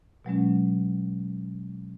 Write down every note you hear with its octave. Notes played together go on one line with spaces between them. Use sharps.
B2 F#3 G#3 C#4